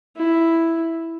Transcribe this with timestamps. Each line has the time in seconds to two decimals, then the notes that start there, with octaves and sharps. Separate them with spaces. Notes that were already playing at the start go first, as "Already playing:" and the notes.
0.17 E4